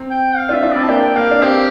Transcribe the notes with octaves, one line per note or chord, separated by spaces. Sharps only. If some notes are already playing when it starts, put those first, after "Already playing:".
Already playing: C4
G5
F5
D4 F4 E5
D4 F4
C4 E4 D5
A5
A#3 D4 G5
A#3 F5
D4
C4 G4